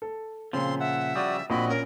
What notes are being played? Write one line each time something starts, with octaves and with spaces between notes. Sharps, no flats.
A4
A#2 C#3 F3 C4 C6
E5 F#5
C#3 F3 G3 F#4 D5 D#6
A#1 A#2 C4 F#4 D#5 B5
C#4 A#4